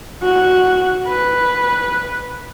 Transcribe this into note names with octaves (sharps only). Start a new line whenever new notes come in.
F#4
B4